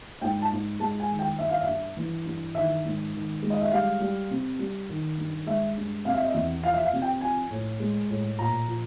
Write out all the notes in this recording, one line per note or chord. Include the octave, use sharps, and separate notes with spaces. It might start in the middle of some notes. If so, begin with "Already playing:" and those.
G#2 G5
A5
G#2
G#3 A5
G#5
D#3
G5
G2 E5
F5
E5
G2
E3
G2
D#3 E5
G#2
D#3
G#3
D#5
E5
G3 F5
G3
C3
G3
D#3
G2
G#3 E5
G2
C3 F5
E5
D#5
E2 E5
F3 F5
E5
F5
C3
G5
F3 G#5
A2
G#3
A2
A#2 A#5
F3